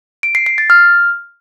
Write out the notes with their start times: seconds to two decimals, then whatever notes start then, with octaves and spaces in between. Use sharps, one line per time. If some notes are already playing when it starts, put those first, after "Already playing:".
0.23 D7
0.35 C7
0.46 C7
0.58 A6
0.70 F6